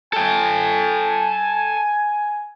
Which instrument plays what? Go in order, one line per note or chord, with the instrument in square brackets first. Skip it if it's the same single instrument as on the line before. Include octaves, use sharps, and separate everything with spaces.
[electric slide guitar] A4 G5 [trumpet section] G#5